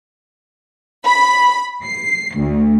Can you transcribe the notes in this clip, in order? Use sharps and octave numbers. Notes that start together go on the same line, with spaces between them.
B5
C7
D2